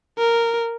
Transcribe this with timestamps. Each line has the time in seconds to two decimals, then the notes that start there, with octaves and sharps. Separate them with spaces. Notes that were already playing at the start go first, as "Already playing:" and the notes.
0.18 A#4